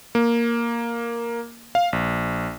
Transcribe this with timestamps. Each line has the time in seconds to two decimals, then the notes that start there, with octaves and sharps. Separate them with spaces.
0.15 A#3
1.75 F5
1.93 A#1